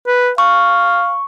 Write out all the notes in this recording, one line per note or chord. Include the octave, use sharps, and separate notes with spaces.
B4
F5 C#6